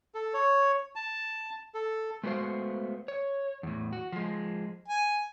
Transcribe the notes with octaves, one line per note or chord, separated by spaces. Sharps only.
A4
C#5
A5
A4
G#3 A3 B3 F#4 C5 F5
C#5
E2 A2
F#4
F3 G#3
G#5